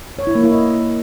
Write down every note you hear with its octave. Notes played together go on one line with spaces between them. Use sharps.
C#5
E4
A#3
E4
D#5